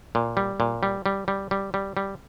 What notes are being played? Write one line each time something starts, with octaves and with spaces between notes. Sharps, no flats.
A#2
G3
A#2
G3
G3
G3
G3
G3
G3